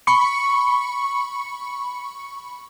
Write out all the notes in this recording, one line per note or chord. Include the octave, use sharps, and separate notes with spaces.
B5 C#6 C#7